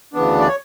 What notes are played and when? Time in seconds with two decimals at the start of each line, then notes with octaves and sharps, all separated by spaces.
0.13 D2 C#3 E3 B3 D4
0.40 D5
0.48 C#5